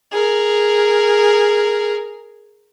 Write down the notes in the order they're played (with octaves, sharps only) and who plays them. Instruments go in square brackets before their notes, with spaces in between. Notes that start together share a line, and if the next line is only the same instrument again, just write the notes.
[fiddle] G#4 A#4